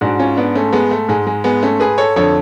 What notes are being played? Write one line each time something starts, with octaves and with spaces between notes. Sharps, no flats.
G#2 D4 F#4
C#4 F4
B3 D4
A3 C#4
G#3 B3
A3
G#2 G#3
G#3
G#3 B3
A3 C#4
G#4 B4
A4 C#5
F2 D3 A4 C#5